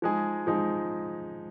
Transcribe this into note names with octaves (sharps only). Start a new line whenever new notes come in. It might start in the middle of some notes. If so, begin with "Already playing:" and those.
F3 G#3 D#4 G#4
F3 G#3 D#4 G#4